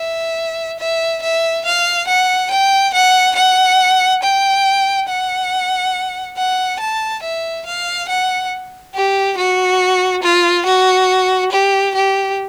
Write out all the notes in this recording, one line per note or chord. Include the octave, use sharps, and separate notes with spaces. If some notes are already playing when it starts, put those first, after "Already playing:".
Already playing: E5
E5
E5
F5
F#5
G5
F#5
F#5
G5
F#5
F#5
A5
E5
F5
F#5
G4
F#4
F4
F#4
G4
G4